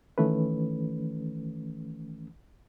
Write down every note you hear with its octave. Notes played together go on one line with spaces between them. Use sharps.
D#3 E3 A3 C#4 B4